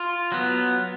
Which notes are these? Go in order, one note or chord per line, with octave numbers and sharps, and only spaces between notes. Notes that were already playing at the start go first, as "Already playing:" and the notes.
Already playing: F4
F#3 B3